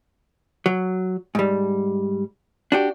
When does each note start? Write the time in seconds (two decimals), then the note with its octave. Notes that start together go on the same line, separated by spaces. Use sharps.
0.66 F#3
1.35 G#2 G3
2.72 D4 F#4 G4